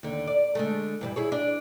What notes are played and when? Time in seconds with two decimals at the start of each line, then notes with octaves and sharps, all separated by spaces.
0.03 D#2 D3
0.27 D5
0.55 D3 G#3 A3
1.01 G2 E3 G3
1.16 E4 G#4 C#5
1.32 D4